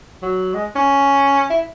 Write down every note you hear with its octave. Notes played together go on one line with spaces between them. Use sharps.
F#3
G#3
C#4
E4